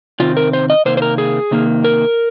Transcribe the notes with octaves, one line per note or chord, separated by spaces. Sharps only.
C3 D#3 C4 F4
A#4
C5
D#5
C3 D#3 A#3 C5
C5
A#4
G#4
C3 D#3 A#3
A#4